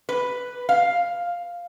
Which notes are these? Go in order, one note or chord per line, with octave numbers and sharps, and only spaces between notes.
B4
F5